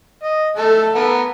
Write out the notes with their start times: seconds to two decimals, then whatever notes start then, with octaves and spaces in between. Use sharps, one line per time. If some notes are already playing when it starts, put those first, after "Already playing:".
0.23 D#5
0.57 A3 A4
0.95 B3 A#4